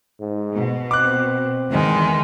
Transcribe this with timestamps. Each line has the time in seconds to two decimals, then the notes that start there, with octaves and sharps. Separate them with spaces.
0.20 G#2
0.54 B2
0.91 C4 D6 F#6
1.70 E2 D#3 G#3